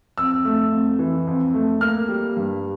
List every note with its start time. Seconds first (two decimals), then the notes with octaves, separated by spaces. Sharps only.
0.17 F2 E6
0.45 A3
0.72 F2
0.99 E3
1.27 F2
1.54 A3
1.81 A#3 F6
2.09 G3
2.37 G2